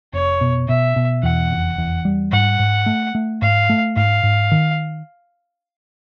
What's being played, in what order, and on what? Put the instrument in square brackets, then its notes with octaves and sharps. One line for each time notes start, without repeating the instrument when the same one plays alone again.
[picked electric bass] F1 [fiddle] C#5
[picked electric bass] B2
[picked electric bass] B2 [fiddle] E5
[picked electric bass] B2
[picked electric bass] E2 [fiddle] F#5
[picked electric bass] F1
E2
G3
[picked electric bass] G#2 [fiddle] F#5
[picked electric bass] G#2
A3
A3
[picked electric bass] G#2 [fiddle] F5
[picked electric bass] A3
[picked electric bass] G#2 [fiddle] F5
[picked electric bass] G#2
D#3